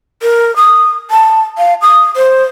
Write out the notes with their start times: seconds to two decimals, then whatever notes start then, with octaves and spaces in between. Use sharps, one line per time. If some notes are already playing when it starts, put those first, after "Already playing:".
0.22 A#4
0.56 D#6
1.11 A5
1.58 F5
1.82 D#6
2.16 C5